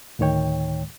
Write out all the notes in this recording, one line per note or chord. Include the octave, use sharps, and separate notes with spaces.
D2 A2 D#3 C#5 G5